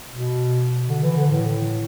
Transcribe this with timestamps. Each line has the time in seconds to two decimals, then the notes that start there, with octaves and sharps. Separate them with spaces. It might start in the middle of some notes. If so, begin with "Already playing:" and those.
0.10 B2
0.89 D3
1.03 E3
1.16 D3
1.30 A2